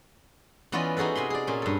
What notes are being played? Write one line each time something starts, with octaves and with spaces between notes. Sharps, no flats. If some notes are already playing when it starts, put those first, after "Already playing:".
E3 B3 C#4 F4 D5 D#5
D#4 F#4 G#4 A4 B4
C3 G#5 B5 C6
G#4 D5
A#2 C#4
G2 A4